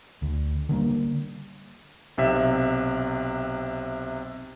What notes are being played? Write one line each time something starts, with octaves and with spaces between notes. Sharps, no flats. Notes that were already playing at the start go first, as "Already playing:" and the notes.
D2
D3 G3 A#3
B1 C3 E5